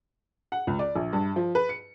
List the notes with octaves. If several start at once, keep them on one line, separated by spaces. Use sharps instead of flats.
F#5
C#2
D5
A#1
G2
F3
B4
C#7